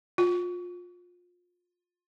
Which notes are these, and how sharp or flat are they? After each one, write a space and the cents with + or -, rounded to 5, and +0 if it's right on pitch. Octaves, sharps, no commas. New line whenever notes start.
F4 +25